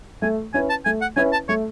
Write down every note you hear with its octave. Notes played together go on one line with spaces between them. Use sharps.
A3 G#5
C#4 E4 B4 G#5
A5
A3 G#5
F#5
C#4 E4 B4 G#5
A5
A3 C#5